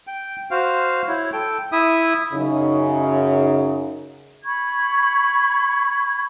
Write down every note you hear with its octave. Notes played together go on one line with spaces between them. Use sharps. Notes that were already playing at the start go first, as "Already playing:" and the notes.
G5
F#4 C5 F5
E4 C#5
A4 G5
E4 E5 D#6
F#2 C#3 D#4
B5 C#6 G#6